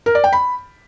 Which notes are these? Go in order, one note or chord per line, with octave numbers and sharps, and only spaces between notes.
A#4
D5
G5
B5